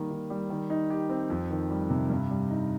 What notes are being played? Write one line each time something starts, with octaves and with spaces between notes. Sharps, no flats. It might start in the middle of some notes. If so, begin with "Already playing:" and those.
Already playing: D#3 G3 A#3
D#3
G3
D#3
D#4
G4
C4
F2
D#3
G3
C3
G2
G3
D#4